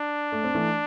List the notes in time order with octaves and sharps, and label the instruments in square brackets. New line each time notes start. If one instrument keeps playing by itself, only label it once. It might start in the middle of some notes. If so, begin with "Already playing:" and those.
Already playing: [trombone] D4
[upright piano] A3
C4
E3 A3